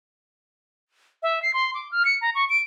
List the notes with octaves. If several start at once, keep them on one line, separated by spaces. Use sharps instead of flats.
E5
C7
C6
D6
F6
C#7
A#5
C#6
D7